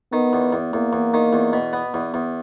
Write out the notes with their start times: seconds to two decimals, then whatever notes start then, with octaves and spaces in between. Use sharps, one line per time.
0.12 D#3 B3
0.33 E2
0.52 E2
0.73 E2 A#3
0.93 E2
1.14 D#3
1.33 E2
1.53 B2
1.73 B3
1.94 E2
2.14 E2